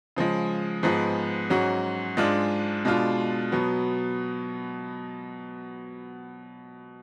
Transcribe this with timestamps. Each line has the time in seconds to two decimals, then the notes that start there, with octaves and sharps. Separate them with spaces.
0.16 C#3 F3 G#3
0.83 G#2 F3 G#3 B3
1.50 G#2 F#3 C#4 F#4
2.17 G#2 G#3 D4 F4
2.85 B2 G#3 D4 F4
3.52 B2 F#3 B3